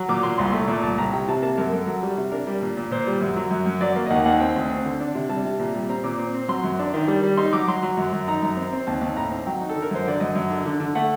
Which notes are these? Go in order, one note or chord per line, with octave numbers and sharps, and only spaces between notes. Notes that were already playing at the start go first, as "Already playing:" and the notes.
Already playing: F#3
A#2 D6
A#2 C6
C2 C6
A3
A#2
C2 A5
C2 A#5
C3 G5
C3 A5
A#3 A5
F#2 A#4
F#2 A4
F#3
G3
C3
D4 A#4
G3
A#2
A#2
A#2 C5
G3
F#2
F#3
F#2
F#2
F#3 D5
A#3
D#5
D#2 F#5
D#2 F#5
C4 G5
D2
C4
D3
D4
C3
G3 A5
C3
A#2
G3
C4 A#5
A#2 D6
C4
C4
F#3 C6
F#2
D4
D#3
G3
G3
D#4 C6
F#3 D6
F#3 C6
F#3
F#2
F#2
D#4 A#5
F#2
C4
C4
D#2 A5
D#2 A5
A2 A#5
C4
F#3 G5
D#4
A4
D3
A#4
F#2 C5
D3 D5
F#2 D#5
F#2
D3
D3
D3
A3 F#5